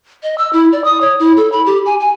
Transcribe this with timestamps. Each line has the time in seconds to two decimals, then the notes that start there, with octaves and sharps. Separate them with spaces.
0.23 D#5
0.38 E6
0.53 E4
0.72 D5
0.84 D#6
1.01 C#5
1.19 E4
1.37 A4
1.52 B5
1.66 G4
1.86 G#5
2.00 G#5